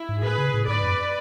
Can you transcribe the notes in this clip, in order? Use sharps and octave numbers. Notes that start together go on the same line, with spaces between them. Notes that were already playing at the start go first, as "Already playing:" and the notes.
Already playing: E4
G#2
A2 G#4 B4
C#3
A2
G#2 B4 D5
F#2